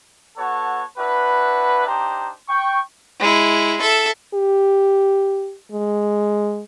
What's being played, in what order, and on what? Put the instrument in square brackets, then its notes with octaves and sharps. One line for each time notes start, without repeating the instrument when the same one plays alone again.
[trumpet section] B3 F#4 A4 C#5 A5
D4 E4 F#4 B4
D4 D#4 G4 C5 A#5
G5 C#6
[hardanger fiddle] G#3 E4
A4 E5
[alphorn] G4
G#3